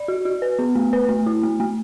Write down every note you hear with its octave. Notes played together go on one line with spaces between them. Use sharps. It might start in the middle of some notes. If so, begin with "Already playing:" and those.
Already playing: D5
F#4
F#4
B4
B3
A3
B4
A3
E4
A3
A3